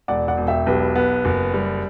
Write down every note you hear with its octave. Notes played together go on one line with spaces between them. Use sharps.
E1 D5 F#5
D5 F#5
E1
E5 G5
B1 G4 B4
B3
F#1
G3